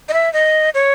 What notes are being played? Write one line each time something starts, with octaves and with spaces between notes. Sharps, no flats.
D#5
E5
D#5
C#5